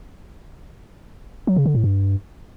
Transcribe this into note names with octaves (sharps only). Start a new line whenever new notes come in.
F#3
C#3
D3
A2
G2